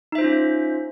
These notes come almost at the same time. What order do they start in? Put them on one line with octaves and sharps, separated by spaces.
D#4 E5 C5 F4 C#4